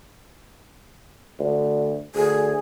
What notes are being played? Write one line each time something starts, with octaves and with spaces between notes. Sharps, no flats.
D2
D2 G#4